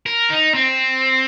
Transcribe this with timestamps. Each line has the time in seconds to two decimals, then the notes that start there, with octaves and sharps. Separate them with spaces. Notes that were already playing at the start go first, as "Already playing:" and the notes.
0.06 A#4
0.30 D#4
0.55 C4